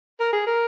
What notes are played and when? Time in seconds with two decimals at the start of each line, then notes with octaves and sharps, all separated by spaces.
0.20 A#4
0.33 G#4
0.47 A#4